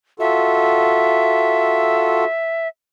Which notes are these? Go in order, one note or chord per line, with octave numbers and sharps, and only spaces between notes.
F4 F#4 A4 E5